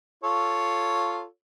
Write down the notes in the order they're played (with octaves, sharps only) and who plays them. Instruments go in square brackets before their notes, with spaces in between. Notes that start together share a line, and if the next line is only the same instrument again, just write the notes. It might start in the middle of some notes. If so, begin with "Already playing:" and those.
[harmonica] F4 A4 C#5